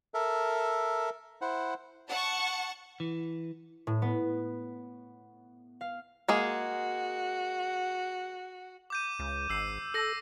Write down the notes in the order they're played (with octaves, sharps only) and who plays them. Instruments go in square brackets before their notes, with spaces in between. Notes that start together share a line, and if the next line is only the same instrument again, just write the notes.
[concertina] A4 A#4 E5
E4 C5 F#5
[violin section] F#5 A5 C#6
[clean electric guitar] E3
[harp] A2
B3
F5
[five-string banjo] G#3 A#3 G#4 [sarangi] F#4
[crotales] D6 G6 D#7
[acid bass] C#2
[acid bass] G#1 [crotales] E6 C7
[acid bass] A4 [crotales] E6 A#6